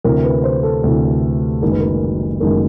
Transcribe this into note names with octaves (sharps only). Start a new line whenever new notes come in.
D2 C3 E3 A#4
B4
C5
A4
D2 C3 E3
F#1 F#2 D#3 G#3 A#4
B4
A#4
F#1 F#2 D#3 G#3 A#4